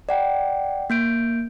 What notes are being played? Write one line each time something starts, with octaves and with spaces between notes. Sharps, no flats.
D5 F#5 G5
A#3 G6 D7